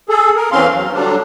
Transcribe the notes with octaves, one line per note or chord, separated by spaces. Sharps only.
G#4 A4
A#4
E2 E3 C4 C#4 F5 C6
F#3
D3 F#3 G3 D4